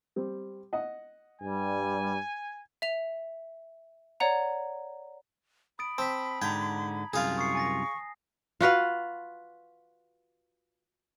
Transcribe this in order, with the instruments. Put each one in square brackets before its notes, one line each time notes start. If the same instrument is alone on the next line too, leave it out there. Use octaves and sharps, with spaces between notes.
[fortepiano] G3 C4
D#5 F#5
[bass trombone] G2 [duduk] G3 [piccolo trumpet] G#5
[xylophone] E5 F7
C#5 D5 F#5 A#5
[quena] B5 [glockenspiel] D#6 A6 D7
[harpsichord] C4 [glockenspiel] A5 B6
[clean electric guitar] G#2 D3 [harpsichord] G5 [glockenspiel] A#5 G#6
[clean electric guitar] C2 F#2 F4 [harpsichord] G#4 F5
[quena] C#6 [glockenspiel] D#6 C7
[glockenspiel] G#5 A6 A#6
[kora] F4 F#4 B4 F5